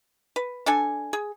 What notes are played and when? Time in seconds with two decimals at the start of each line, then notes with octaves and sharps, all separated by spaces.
0.36 B4
0.66 D4 A4 G#5
1.13 G#4